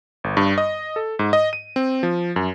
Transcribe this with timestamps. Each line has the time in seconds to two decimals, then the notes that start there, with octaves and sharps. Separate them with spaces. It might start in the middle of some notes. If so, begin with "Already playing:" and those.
0.24 G1
0.37 G2
0.58 D#5
0.96 A4
1.19 G#2
1.33 D#5
1.53 D#7
1.76 C4
2.03 F3
2.36 F#2